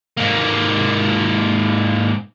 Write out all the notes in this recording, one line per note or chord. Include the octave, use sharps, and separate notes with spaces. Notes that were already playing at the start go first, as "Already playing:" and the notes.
G#2 A#3